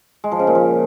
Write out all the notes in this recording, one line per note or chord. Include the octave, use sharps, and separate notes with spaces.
G#3
F3
C#3
A#2
F3